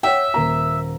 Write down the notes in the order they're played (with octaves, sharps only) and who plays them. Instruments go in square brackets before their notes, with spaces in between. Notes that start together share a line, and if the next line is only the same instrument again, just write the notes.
[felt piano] C#5 F#5 G5 [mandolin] E5
[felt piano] D#1 A#3 A#5